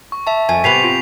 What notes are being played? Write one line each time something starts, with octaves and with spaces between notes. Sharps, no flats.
C#6
E5 A5
F2 G#5
C3 B3 B6 C7 F7
F4